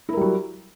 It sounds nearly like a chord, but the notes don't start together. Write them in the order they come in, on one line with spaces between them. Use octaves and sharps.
E4 A#4 G3 F#3